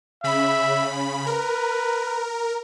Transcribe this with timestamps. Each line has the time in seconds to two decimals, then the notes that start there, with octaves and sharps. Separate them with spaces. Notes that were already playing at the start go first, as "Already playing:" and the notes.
0.24 C#3 E5 B5
1.26 A#4 B4